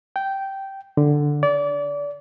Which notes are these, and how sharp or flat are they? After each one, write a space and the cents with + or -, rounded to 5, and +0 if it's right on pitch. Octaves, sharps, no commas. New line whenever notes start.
G5 -10
D3 +0
D5 -30